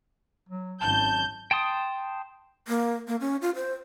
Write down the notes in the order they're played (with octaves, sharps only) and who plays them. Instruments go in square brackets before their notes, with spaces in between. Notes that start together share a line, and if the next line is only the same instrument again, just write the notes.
[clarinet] F#3
[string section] G#1 F#2 G6 [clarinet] A5
[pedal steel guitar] G5 A5 C6 D#6
[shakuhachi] A#3
A#3
C#4
F4
C5